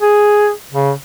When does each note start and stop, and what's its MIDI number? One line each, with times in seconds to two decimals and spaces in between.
0.01 0.51 68
0.72 0.91 49